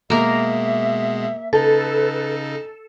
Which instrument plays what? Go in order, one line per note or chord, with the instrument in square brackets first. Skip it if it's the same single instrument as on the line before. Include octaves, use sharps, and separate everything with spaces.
[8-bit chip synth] B2 G#3 [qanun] A#3 A#4 [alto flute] E5
[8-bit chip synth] C#3 D#4 [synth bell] A4 [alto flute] B4